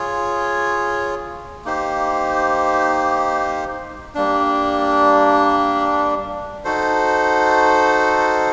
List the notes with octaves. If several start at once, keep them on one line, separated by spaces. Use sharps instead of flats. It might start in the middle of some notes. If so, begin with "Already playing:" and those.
Already playing: F4 G#4 C#5
A#3 D#4 G4 C5
G3 A#3 D4
D#4 F#4 A4 C5